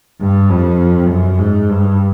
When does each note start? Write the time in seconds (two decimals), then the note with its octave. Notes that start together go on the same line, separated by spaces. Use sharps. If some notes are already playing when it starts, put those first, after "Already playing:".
0.21 G2
0.50 F2
1.10 F#2
1.40 G#2
1.70 G2